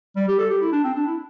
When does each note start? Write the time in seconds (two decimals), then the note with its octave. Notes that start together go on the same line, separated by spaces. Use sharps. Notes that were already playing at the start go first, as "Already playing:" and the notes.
0.16 G3
0.28 G4
0.39 A4
0.50 G4
0.61 E4
0.72 D4
0.84 C4
0.95 D4
1.06 E4